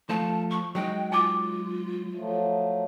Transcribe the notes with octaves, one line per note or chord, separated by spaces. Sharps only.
F3 A3 F4 A5
C#6
F#3 G#3 D#4 G5
F4 G#5 D6
F3 F#3 A3